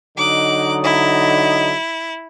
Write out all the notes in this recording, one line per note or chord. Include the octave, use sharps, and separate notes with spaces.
D3 F#3 D#4 D6 F#6
E4